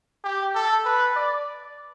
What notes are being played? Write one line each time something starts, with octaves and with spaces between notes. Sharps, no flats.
G4
A4
B4
D5